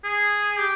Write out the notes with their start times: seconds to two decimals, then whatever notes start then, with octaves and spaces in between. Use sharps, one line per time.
0.04 G#4
0.59 G4